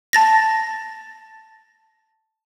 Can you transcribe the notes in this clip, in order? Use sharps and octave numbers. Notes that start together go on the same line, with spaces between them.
A5 A6 A#6